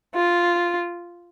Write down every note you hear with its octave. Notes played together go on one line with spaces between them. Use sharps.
F4